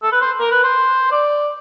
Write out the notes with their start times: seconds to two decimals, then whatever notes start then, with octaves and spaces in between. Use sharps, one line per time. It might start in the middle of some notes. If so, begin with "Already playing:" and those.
0.03 A4
0.12 B4
0.21 C5
0.40 A#4
0.51 B4
0.64 C5
1.11 D5